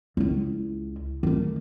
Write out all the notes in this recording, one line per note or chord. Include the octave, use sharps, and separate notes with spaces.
C#2 E4
D#3 A3